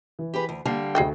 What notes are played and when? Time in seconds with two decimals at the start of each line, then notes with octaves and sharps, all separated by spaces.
0.19 E3
0.34 G4 G#4 B4
0.49 D2
0.65 D3 G3 A#3 A5 C7
0.95 D2 F#4 G#4 A4 D#5 G5